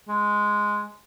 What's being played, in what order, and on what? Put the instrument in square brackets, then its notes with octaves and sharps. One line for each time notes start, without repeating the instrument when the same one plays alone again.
[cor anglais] G#3